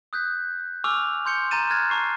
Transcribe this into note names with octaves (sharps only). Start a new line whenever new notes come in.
D#6 F#6 G6 B6
G#5 C#6 D6 E6 F6 F7
C6 G6 C#7 G7
A#5 C6 G6 A6 D#7 E7
F6 F#6 G#6 A6
A5 A#5 C#6 C7